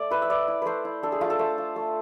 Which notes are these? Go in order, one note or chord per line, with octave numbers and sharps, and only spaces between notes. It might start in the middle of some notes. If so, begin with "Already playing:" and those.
Already playing: A3 D5
E4 B4
E5
E4 D5
E4
A3 B4 C5
E4
D4 A4
G#4
A3 F4
A4
A3 C5
F4
A3